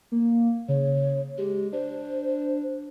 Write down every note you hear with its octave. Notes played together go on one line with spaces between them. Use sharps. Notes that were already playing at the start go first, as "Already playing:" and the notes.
A#3
C#3 C#5
G#3 G4
D4 C5